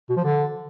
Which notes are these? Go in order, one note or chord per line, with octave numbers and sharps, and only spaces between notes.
B2
F3
D3